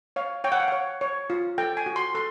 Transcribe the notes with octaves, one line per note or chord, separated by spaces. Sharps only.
C#5 F5
C#5 G5
F#5
F5
C#5 F#5
C#5
F4
A4 G5
G#5
F#4
C6
A4 C6